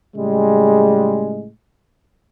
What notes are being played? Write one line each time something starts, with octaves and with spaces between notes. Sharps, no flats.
A2 C#3 G3 G#3